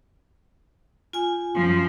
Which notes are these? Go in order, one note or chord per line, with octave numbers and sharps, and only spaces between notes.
F4 G#5
F#2 F3